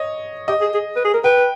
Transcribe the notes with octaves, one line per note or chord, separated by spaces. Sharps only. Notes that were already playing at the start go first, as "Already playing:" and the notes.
Already playing: C#5 D#5
G4 D#5
G#4
G#4
B4
G#4
A#4
B4 G5